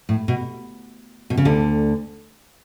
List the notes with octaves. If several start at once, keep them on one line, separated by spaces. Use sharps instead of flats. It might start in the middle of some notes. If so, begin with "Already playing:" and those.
A2
B2
B2
C#3
D2 D3